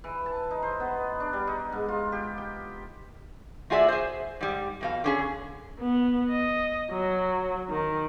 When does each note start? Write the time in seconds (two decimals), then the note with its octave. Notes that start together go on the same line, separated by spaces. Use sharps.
0.04 E3
0.26 A5
0.51 D#4
0.63 C5
0.80 B3
1.20 D4
1.33 G3
1.47 D#4
1.72 G#2
1.88 F4
2.12 G4
2.38 G5
3.70 A3 F4 F#4 G#4 D5 E5
3.88 G#4 C5
4.41 G#2 G3
4.81 F2 B2 F5
5.04 D3 C#4 G#4
5.79 B3
6.29 D#5
6.91 F#3
7.69 D#3